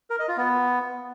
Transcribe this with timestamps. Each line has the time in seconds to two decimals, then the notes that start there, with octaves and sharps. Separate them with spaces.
0.10 A#4
0.19 D#5
0.28 F4
0.37 B3